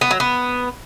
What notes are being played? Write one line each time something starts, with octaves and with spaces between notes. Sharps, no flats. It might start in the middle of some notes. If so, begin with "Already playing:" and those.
B3
F#3
B3